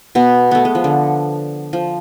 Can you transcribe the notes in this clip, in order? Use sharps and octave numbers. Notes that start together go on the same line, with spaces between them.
B2 B3
A3 B3
G#3
F3
D3
F3